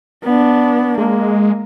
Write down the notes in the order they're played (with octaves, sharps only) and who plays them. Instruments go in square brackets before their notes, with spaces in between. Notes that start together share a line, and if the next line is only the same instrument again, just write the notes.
[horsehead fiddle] B3 D4
[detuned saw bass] G#3 [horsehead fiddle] A#3